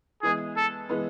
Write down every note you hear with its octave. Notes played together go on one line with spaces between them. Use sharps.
E3 G#3 B3 G#4
A4
E3 G#3 B3